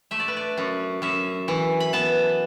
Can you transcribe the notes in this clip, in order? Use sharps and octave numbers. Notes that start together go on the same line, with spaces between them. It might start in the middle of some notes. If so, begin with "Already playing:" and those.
A3 E5
D5
B4
D5
F#2
F#2 E5
E3
B5
B3 A5